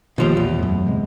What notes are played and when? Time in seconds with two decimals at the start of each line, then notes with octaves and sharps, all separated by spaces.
0.18 A#1 D#2 B2 F3 G3
0.37 E2
0.59 F#2 A2
0.86 C3 G#3